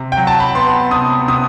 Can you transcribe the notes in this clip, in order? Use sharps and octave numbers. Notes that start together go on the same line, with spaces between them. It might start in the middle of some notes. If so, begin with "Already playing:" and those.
Already playing: C3
G5
F#3
A5
B5
B3 C6
C3 D#6
C3 D#6